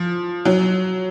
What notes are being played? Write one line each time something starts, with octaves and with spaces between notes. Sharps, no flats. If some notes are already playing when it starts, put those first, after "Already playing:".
Already playing: F3
F#3